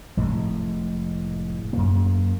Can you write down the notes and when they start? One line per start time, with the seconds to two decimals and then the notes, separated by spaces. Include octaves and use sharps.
0.17 F1 A2 G#3
1.73 F#2 A#3